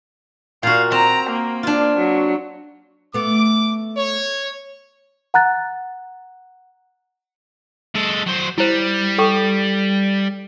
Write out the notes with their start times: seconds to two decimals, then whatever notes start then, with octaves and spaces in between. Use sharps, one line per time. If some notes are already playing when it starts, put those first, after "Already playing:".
0.63 A#2 F#4 F5
0.92 C4 A#5
1.29 A#3
1.63 D4 F4
1.98 F#3
3.14 A3 B3 D6
3.97 C#5
5.34 F#5 A#5 F#6 A6
7.95 G#3 A4
8.26 F#3 C5
8.58 G3 E4 C5
9.18 A4 G5 C#6